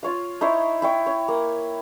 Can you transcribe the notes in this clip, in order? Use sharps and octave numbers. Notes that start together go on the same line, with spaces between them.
F4 C#5 F5
D#4 E4 C5 C#5
E4 G5 C#6
C#5
A#3